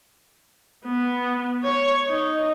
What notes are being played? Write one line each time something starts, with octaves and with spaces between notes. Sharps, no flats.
B3
C#5
D#4